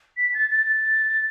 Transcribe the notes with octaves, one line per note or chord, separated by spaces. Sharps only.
B6
A6
A6
A6